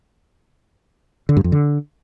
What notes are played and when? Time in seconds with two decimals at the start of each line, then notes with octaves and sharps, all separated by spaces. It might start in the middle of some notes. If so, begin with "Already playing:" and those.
1.29 D3
1.37 G2
1.44 F2
1.52 D3